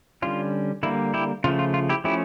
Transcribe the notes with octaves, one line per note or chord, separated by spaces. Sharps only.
D3 G3 C#4 F4
D3 G3 A#3 E4
E4 G4
C#3 F3 A3 F4
F4
F4
E4 G4
F3 A3 C#4 E4 G4